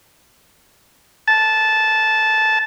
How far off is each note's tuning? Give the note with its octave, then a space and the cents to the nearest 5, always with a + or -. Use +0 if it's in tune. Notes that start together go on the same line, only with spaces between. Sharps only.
A5 -10